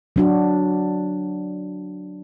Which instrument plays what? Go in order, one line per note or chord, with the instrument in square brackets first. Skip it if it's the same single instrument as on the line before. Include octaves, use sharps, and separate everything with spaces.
[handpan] F#3 D4 F#4